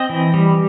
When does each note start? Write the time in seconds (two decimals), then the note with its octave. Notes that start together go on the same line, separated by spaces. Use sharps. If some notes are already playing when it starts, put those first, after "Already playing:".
Already playing: C4 D#5
0.09 E3
0.34 G3